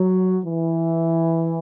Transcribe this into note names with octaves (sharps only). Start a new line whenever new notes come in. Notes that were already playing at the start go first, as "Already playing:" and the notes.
Already playing: F#3
E3